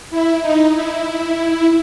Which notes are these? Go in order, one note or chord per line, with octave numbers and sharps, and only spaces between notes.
E4
D#4
E4